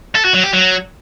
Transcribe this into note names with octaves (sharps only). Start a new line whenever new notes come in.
A4
F#4
F#3
G4
F#3